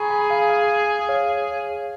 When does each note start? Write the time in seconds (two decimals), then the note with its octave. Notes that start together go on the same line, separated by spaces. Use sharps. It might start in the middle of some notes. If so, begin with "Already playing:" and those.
Already playing: G#4 G#5 A#5 B5 C#6
0.10 G#5 B5
0.29 F5 G#5
0.49 F5 G#5
1.09 C#5 F5